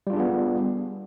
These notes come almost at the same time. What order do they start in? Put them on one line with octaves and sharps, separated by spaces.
G3 F4 D4 G#4 B3